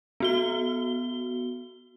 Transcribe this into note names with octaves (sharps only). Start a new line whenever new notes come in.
B3 F#4 G7